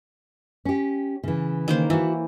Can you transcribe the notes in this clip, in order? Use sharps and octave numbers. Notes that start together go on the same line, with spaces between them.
C#4 G4
C#3 E3
D#3 A#3 C5
E3 E4 F#4